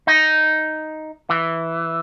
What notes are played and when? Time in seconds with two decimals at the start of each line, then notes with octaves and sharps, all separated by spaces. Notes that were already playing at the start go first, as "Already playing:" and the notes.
0.07 D#4
1.30 E3